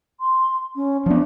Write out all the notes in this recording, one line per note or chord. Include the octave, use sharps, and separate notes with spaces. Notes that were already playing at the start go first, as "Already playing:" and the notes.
C6
C#4
F3 B3 D4